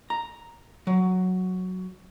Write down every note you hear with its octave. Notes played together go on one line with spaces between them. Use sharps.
A#5
F#3